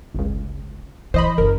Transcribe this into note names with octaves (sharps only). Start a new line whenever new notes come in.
G1 C#2
E3 C5 D#5 B5
F#1 A#4